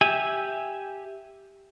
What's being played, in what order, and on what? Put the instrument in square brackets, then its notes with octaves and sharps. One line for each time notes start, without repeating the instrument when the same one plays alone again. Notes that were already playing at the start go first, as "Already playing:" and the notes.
[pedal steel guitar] G4 E5 G#5